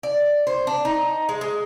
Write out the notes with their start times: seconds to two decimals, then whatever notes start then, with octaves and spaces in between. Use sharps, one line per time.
0.03 D5
0.47 C5
0.67 D4
0.85 D#4
1.29 G#3
1.41 G#3